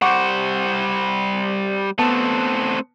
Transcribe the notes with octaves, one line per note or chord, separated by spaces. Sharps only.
G3 C5 F#5 C#6 D6
A3 B3 C4 A5